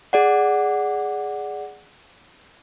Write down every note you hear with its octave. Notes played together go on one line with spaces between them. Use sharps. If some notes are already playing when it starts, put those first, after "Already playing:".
G#4 D5 F#5